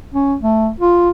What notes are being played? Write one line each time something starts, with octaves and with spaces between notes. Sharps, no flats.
C#4
A3
F4